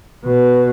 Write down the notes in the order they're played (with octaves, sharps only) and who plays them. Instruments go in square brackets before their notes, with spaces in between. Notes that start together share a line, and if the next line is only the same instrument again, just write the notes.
[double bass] B2